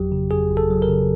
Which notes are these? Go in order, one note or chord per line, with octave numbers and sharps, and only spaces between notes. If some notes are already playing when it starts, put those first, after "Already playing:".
Already playing: G1 F2 F#3 G4
C#3
F2 G#4
G1
A4
F#3
A#4
C#3